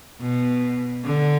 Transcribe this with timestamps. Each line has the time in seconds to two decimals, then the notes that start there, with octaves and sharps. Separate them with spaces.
0.21 B2
1.05 D3